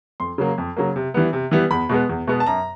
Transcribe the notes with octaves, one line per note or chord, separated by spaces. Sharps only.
F2 C6
C#3 F#3 A#3
F2
C#3 F#3 A#3
C3
E3 G3 B3
C3
E3 G3 B3
E2 B5
B2 G#3 B3
E2
B2 G#3 B3
A5
F#2 A#5